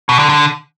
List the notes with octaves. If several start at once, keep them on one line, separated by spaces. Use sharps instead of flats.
B2
D3
D3